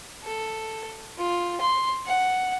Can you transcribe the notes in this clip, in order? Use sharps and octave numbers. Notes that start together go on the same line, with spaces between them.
A4
F4
C6
F#5